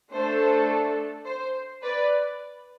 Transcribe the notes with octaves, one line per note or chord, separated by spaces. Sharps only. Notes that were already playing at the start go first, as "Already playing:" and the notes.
A3 D4 A4 C5
C5
B4 D5